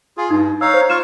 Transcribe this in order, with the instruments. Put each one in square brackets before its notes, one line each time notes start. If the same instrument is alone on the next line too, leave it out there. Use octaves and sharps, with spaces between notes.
[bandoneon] F4 G#4
[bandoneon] G2 [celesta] D#4
[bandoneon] D#4 C#5 F5 [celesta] E6
[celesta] C5
[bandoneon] F4 C#6 [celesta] F6 E7